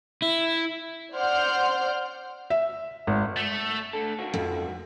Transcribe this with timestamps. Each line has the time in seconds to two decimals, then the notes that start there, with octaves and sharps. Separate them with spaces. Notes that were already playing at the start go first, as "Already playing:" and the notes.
0.22 E4
1.13 C5 D5 F#5 C6 F6 G6
2.50 E5
3.07 G#1
3.37 A3
3.93 D3 A3 A4
4.18 C#2 D#3 F#4
4.34 F2